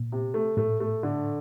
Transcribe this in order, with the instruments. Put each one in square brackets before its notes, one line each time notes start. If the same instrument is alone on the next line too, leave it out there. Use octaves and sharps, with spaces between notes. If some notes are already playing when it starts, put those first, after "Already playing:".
Already playing: [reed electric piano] A#2
[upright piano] C3
A3
[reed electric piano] A2 [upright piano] A3
[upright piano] A3
D3